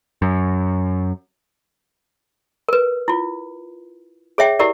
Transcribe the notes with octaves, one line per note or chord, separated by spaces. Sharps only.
F#2
A#4 B4
E4 F4
G#4 C#5 E5 G5
E4 G4 A#4 D5